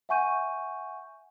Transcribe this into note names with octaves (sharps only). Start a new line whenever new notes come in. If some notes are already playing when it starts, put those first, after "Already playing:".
E5 F#5 G#5 C#6 G6 D#7